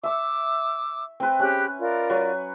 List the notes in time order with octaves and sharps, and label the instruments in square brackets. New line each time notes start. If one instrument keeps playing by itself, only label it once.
[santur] E5 C#6 [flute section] D6 E6
[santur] C4 B4
[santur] C#4 [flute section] G4 G#4 F#6
[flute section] F4 A#4 D5
[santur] F#3 B4 C#5